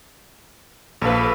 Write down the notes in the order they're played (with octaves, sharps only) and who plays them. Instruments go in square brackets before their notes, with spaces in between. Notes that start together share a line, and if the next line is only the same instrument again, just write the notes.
[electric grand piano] A#1 F5 [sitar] A4 B4